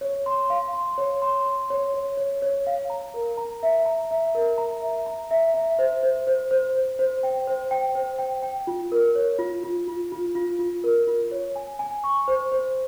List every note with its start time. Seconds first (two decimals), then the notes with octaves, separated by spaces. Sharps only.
0.01 C#5
0.26 C6
0.50 F5
0.73 C6
0.98 C#5
1.22 C6
1.46 C6
1.70 C#5
1.94 C#5
2.17 C#5
2.42 C#5
2.67 F5
2.90 A#5
3.14 A#4
3.38 A#5
3.63 E5
3.86 A#5
4.11 E5
4.35 A#4
4.58 A#5
4.82 E5
5.06 A#5
5.31 E5
5.54 E5
5.79 C5
6.03 C5
6.27 C5
6.51 C5
6.75 C5
6.99 C5
7.23 G5
7.48 C5
7.71 G5
7.95 C5
8.18 G5
8.43 G5
8.67 F4
8.92 A#4
9.15 C#5
9.39 F4
9.64 F4
9.88 F4
10.12 F4
10.35 F4
10.59 F4
10.84 A#4
11.07 F4
11.31 C#5
11.56 G#5
11.79 G#5
12.04 C#6
12.28 C5
12.52 C5